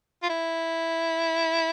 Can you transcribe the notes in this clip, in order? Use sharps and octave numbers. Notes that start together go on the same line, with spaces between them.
F4
E4